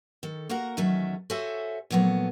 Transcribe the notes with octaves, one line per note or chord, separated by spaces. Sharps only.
D#3 A4
A#3 F#4 A#4 F#5 A#5
E2 D#3 F#3 A3 C#4 E5
F#4 A4 C5 C#5 E5 G#5
A#2 F3 F#3 A3 B3